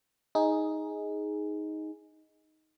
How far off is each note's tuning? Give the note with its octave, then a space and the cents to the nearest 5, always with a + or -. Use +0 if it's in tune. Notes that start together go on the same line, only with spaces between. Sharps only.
D#4 +10 G#4 +0